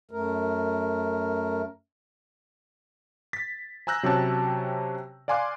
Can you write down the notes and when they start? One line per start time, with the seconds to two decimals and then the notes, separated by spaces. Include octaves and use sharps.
0.11 F#2 A3 A#4
3.33 A6 B6
3.87 G#5 A#5 E6 F#6 G6 A#6
4.03 C3 F#3 C#4 G4 C#5 A5
5.28 D5 F5 G#5 C6 D6 F#6